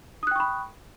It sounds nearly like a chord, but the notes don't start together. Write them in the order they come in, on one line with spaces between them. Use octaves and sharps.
D#6 F#6 G5 C#6 B5